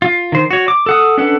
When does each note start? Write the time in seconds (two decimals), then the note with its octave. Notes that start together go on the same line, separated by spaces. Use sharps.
0.02 F4
0.32 D#3 C5
0.51 F#4 C#5
0.68 D6
0.86 A4 F#5 D#6
1.18 C#4 D4 A4 B4 F#5